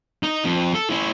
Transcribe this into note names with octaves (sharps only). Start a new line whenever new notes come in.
D#4
F2
A4
C#4 E4